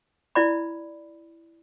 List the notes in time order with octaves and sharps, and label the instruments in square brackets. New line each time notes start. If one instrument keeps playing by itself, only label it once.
[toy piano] E4 D5 B5